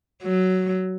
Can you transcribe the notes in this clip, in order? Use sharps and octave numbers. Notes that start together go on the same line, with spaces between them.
F#3